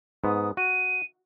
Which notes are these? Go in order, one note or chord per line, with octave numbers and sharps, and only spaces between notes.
G#2 B3 D#6
F#4 D#7